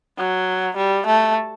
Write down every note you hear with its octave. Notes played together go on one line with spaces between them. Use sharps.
F#3
G3
A3